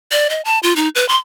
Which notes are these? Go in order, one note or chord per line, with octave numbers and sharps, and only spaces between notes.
D5
D#5
A5
F4
D#4
B4
C6